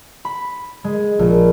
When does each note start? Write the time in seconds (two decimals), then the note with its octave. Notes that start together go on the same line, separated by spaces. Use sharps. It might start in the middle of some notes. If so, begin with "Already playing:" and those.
0.25 B5
0.84 G#3
1.19 A#1